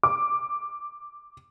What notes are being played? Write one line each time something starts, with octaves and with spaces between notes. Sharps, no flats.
D6